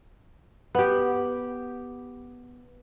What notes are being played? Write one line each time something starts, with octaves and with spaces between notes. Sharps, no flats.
B3 G4